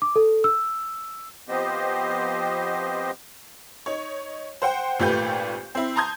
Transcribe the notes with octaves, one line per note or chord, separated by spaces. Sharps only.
D6
A4
E6
F3 B3 C4 G4 C5 D#5
D#4 C#5
C5 F#5 G5
G#1 A#2 A3 G4 B4 G6
C4 E4
A5 A#5 C6 D#6 G6 G#6